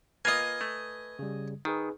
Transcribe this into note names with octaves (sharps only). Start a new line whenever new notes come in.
A#3 F4 B4 D#5 G#5
A3
C#3 G3
D#3 D#4 G#4 B4